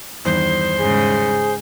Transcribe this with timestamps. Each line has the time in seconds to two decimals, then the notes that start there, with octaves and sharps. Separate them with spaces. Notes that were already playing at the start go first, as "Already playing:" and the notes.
0.25 E2 G2 D#3 C5
0.80 G#2 C#3 G#4